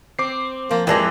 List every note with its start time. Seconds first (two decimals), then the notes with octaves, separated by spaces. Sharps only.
0.19 C4 D6 C7
0.71 F3 A#3 F4
0.87 F2 A#2 E3 G#3 G4 G5 A5 A#6